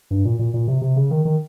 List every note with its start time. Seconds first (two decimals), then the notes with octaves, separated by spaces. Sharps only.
0.11 G2
0.25 A#2
0.39 A#2
0.54 A#2
0.68 C3
0.82 C3
0.96 C#3
1.11 D#3
1.25 D#3